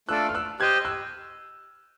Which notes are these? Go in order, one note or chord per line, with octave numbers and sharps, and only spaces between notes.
A3 D4 F4 A4 D5 E6 F#6
F6
E6 F#6
G4 C5 D#5 F#6 G#6
E6 F#6